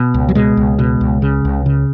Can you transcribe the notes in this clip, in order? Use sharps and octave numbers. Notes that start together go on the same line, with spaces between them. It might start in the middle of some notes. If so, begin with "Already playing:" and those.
Already playing: B2
C#2
F#3
B2 G#3
C#2
B2
C#2
C#3
C#2
C#3